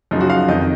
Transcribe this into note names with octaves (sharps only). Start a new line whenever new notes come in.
F#2 C#3 F3 D#4
F#4
F5
F2 D#3 D#5